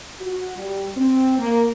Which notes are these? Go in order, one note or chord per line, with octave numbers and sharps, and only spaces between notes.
F#4
G3
C4
A#3